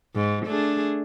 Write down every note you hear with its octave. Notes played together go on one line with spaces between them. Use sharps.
G#2
A3 D4 G#4